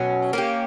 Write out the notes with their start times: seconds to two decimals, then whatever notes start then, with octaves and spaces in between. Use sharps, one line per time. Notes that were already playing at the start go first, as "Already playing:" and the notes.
Already playing: B2 F#3 C#4
0.33 A#3 C#4 G4